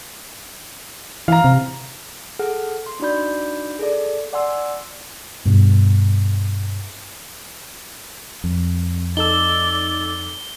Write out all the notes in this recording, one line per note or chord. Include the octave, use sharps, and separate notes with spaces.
E3 F5 A#5
C3
G#4 A4 F#5 F6
C6
D4 D#4 F#4 D5 B5 G6
G#4 A4 D5
D5 F#5 G#5 C6 E6
G2 B2
F2
D#4 A4 D5 E6 G7